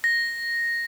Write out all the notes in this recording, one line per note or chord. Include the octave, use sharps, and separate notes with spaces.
A#6